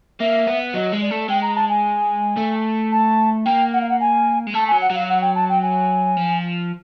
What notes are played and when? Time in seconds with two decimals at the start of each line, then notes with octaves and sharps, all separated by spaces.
0.20 A#3 E5
0.47 B3
0.74 F#3 D#5
0.93 G#3
1.01 D5
1.11 A3
1.29 G#3 G5
1.42 A#5
1.55 A5
1.69 G#5
2.37 A3
2.92 A5
3.45 A#3 G5
3.73 F#5
3.81 F5
3.89 F#5
4.00 G#5
4.47 G#3
4.54 A3 A5
4.67 F#3 G#5
4.81 F#5
4.90 F#3 F5
5.09 F#5
5.21 G5
5.35 A5
5.49 G5
5.62 G#5
6.17 F3